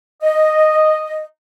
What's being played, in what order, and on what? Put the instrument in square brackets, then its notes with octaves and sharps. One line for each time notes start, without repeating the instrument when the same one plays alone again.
[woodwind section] D#5